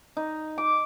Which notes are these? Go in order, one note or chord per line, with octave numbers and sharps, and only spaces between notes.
D#4
D6